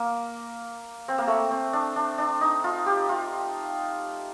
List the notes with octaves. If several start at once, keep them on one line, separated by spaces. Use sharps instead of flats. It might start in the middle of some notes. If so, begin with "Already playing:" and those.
Already playing: A#3
C4
A#3
A3
C4
D4
D4
D4
D#4
F4
G4
F4